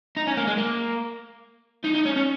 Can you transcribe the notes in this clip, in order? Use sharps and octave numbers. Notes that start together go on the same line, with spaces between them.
D#4
C#4
A#3
G#3
A#3
D#4
D#4
C#4
C#4